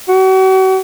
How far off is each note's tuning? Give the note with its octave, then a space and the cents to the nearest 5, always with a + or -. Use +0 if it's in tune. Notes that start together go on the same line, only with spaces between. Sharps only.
F#4 +40